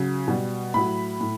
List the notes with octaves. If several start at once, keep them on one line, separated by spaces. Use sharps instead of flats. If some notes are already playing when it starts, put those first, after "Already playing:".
Already playing: C#3 F#3
B2 G3
A2 F#3 B5
A2